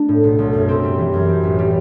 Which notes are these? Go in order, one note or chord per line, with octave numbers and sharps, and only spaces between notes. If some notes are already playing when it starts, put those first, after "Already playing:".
Already playing: A3 D4
A2
B1
B1
F#2
C4
G3
E3
F#2
C4
A1
G3